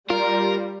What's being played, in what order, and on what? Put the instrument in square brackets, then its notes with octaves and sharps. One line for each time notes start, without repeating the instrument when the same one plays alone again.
[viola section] G3 [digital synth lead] F4 [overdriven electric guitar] A#4